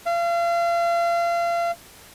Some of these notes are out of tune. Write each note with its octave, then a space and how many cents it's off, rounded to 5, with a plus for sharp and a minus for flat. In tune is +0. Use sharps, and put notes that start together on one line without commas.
F5 -35